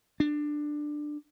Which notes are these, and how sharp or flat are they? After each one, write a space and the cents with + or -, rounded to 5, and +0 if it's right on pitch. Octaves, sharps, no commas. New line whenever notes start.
D4 +15